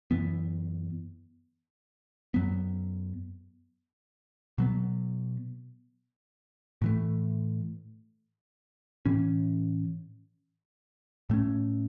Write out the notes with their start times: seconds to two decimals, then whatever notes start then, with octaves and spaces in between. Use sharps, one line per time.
0.11 F#2 E3 B3
2.34 F#2 F#3 B3
4.58 B2 F#3 B3
6.82 A2 E3 A3
9.05 A2 E3 C#4
11.30 A2 A3 C#4